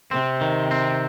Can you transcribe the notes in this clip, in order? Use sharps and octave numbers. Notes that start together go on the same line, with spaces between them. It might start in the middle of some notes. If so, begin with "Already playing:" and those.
C3 C4
D#3
C4